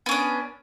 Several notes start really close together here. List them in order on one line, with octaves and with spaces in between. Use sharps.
B3 C#4 D4